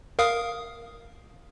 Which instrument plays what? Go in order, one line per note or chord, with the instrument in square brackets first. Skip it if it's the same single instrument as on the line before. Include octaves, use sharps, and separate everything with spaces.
[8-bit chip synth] A#4 F5 D#6